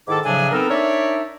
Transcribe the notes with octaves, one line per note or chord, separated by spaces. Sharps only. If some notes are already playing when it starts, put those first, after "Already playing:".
G#2 D#3 E4 A4 A5 D6
A2 C#3 F3 F#3 D4 G#5
B3 C4 D#4 A4 A#4
D4 D#4 A#4 C#5 D5 E5